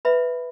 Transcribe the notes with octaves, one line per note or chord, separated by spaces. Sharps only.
B4 E5 B5